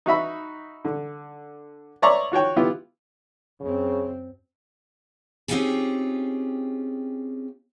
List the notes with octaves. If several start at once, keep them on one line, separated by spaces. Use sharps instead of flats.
D#4 F#4 E5 B5
D3
C#5 D5 E5 A#5 C6 C#6
F4 F#4 C#5 G5
B3 E4 F4 G4
F#2 C#3 C4
C4 C#4 D#4 F4 G4 G#4